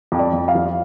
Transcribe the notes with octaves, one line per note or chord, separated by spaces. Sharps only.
F2
D5
F2
F5
F3